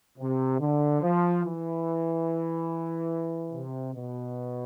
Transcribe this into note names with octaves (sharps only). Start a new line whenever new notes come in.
C3
D3
F3
E3
C3
B2